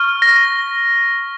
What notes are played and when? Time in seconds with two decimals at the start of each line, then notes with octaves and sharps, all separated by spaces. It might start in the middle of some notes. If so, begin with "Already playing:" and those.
Already playing: C#6 F6
0.22 A#6